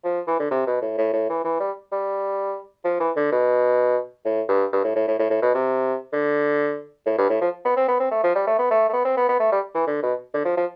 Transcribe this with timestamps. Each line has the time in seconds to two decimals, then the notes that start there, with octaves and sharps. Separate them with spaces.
0.04 F3
0.28 E3
0.40 D3
0.51 C3
0.67 B2
0.82 A2
0.98 A2
1.14 A2
1.30 E3
1.44 E3
1.60 G3
1.92 G3
2.85 F3
3.00 E3
3.16 D3
3.32 B2
4.25 A2
4.49 G2
4.73 G2
4.84 A2
4.96 A2
5.08 A2
5.19 A2
5.30 A2
5.42 B2
5.54 C3
6.13 D3
7.06 A2
7.18 G2
7.30 A2
7.41 F3
7.65 B3
7.77 C4
7.88 B3
8.00 C4
8.12 A3
8.24 F3
8.35 G3
8.47 A3
8.59 B3
8.71 A3
8.89 A3
8.93 B3
9.05 C4
9.17 B3
9.29 B3
9.40 A3
9.52 G3
9.75 E3
9.87 D3
10.03 B2
10.34 D3
10.45 F3
10.58 F3